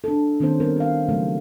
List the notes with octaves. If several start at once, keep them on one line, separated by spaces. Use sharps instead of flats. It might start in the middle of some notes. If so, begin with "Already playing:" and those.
D4 A4
D#3 A#3 C4 C#4 C5
G3 B3 A#4
G4 F5
C#3 F#3 A3